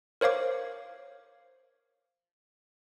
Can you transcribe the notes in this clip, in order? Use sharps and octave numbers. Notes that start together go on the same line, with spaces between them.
A#4 C5 C#5 F5 D6